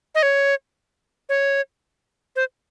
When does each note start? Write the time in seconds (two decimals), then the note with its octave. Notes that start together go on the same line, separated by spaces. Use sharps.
0.15 D#5
0.23 C#5
1.29 C#5
2.36 C5